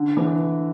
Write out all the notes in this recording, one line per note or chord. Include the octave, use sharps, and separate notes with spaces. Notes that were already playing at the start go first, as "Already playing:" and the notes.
Already playing: D3
E3